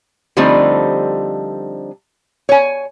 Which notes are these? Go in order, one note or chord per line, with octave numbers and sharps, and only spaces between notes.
D3 F3 G3 A3 C4 D#4
C#5 G#5